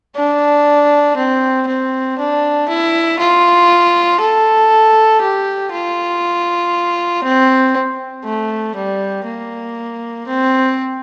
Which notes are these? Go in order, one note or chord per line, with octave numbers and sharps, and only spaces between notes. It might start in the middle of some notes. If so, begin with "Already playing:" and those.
D4
C4
C4
D4
E4
F4
A4
G4
F4
C4
A3
G3
A#3
C4